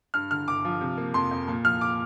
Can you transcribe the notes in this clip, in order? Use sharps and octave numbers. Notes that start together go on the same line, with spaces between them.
G2 F6
D3 F6
G1 D6
F3
C3
A#3
F2 C6
F2
A#2
F3 F6
D6